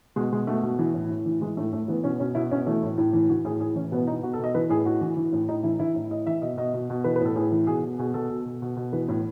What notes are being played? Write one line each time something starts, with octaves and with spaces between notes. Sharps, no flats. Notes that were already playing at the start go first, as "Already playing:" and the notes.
B2 G#3
B2 G#3
B2 A3
B2
E3
A2
A2
E3
E3 G#3
A2 A3
A2 A3
E3 B3
B2 C#4
B2 C#4
B2 E4
B2 C#4
E3 A3
A2
A2
E3
E3 F#4
A2 G#4
A2 G#4
E3 C#4
B2 B3
B2 D#4
B2 F#4
A4
B2 D#5
E3 B4
A2 G#4
A2 F#4
E3
E3
A2
A2 D#4
E3 E4
E3 E4
A2
A2 D#5
E3 E5
B2 D#5
B2 D#5
B2
B2
E3 B4
B4
A2 A4
A2 G#4
E3
B2 G#4
B2
B2 G#4
B2 A4
B2
B2
B2
B2
E3 B4
A2